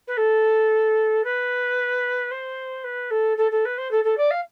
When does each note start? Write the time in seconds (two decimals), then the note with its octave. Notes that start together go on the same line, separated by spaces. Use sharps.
0.07 B4
0.17 A4
1.24 B4
2.31 C5
2.84 B4
3.11 A4
3.37 A4
3.51 A4
3.65 B4
3.78 C5
3.91 A4
4.04 A4
4.17 D5
4.31 F5